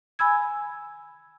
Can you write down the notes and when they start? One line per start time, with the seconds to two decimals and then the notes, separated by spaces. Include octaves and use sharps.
0.19 G#5 B5 E6 G#6